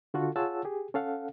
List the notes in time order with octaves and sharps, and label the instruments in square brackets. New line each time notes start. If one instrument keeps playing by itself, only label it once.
[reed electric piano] D3 F4 F#4 A4
F4 G#4 C#5 F#5 A5 E6
G4 G#4
C#4 A4 F5 F#5